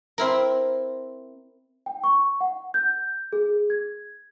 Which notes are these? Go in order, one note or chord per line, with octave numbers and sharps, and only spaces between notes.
C4 E4 A#4
G5
C#6
F#5
G6
G#4
G#6